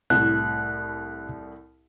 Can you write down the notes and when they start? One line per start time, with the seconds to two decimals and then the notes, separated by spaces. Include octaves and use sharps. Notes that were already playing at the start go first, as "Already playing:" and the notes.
0.10 C2 A2 F#6